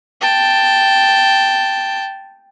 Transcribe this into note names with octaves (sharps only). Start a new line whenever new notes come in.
G5 A5